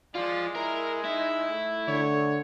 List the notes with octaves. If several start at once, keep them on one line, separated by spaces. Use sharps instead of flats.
F3 G#3 F4 D5
E4 A#4
D#4 E4
A3
D3 C#5